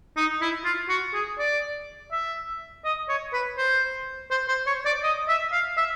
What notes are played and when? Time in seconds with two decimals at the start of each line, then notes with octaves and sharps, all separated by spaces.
0.17 D#4
0.41 E4
0.65 F4
0.89 F#4
1.14 G#4
1.39 D5
2.12 E5
2.85 D#5
3.09 C#5
3.33 B4
3.58 C5
4.31 C5
4.48 C5
4.67 C#5
4.86 D5
5.03 D#5
5.29 E5
5.52 F5
5.77 E5